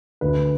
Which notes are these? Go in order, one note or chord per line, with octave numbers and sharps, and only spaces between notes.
D2 B4